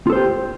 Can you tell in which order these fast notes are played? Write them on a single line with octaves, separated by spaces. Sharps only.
F4 A4 C5 G4